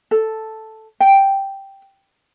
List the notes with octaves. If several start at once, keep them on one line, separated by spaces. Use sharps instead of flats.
A4
G5